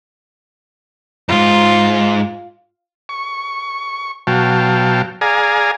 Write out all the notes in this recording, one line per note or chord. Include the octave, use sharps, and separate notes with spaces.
F2 G#2 F4
C#6
B2 F#3 F5 G5 A5
G#4 D5 F5 G#5 A#5